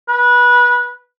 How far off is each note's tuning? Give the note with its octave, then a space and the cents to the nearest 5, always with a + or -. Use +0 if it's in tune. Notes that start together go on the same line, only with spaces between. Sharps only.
B4 -20